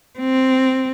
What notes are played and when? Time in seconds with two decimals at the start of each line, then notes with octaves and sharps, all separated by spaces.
0.19 C4